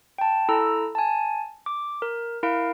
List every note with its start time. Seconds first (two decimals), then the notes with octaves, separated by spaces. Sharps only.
0.18 G5 A5
0.49 E4 A4 A#5 E6
0.95 G#5 A5
1.66 D6
2.02 A#4
2.43 E4 A#4 F5 D7